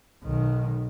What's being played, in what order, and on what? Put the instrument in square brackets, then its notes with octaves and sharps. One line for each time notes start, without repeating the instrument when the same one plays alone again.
[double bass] B1 D#3